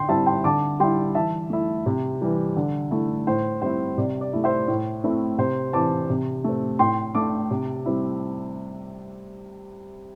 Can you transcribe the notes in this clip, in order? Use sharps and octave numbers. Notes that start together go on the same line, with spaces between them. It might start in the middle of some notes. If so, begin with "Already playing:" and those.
Already playing: D3 G5 C6
G3 C4 E4 E5 A5
G5 C6
D3 A5 D6
G3 E4 G5 C6
E3 E5 A5
A3 E4
C3
E3 G3
D3
A3 E4
A2 C5
G3 C4 E4 C5
C3 D5
D5
A3 E4
C5 E5
A2
A3 C4 E4
C3 C5
E3 C4 A5 D6
C3
A3 C4
A2 G5 C6
A3 D4 A5 D6
C3
G3 C4 E4